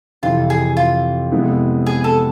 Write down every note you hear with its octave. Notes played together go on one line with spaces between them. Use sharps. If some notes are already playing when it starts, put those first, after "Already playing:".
F2 C3 E3 F4
G#4
F4
F2 C3 G#3 B3 E4
G#4
A4